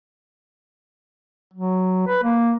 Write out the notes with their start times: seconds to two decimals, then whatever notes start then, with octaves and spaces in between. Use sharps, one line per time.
1.54 F#3
2.08 B4
2.24 A#3